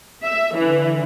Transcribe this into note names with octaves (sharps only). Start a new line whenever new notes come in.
E5
D3 E3